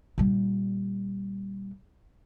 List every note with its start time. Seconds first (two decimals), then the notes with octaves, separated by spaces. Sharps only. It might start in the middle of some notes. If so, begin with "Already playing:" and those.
0.18 A#2 G3